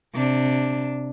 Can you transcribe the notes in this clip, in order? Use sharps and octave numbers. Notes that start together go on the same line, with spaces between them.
C3 D4